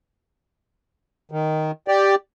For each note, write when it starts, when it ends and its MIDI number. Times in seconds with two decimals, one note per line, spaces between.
1.31 1.71 51
1.88 2.15 67
1.88 2.15 74